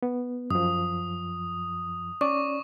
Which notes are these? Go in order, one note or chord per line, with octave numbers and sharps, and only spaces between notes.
B3
F#2 F3 D#6
C#4 D5 C#6 D6